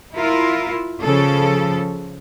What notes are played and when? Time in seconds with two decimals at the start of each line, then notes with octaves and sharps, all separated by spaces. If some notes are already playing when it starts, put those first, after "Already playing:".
0.15 E4 F4 A#4
1.03 C#3 F3 A4